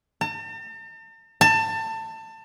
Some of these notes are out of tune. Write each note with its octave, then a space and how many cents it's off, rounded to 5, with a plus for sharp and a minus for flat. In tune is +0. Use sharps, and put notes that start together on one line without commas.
A5 +45
A5 +25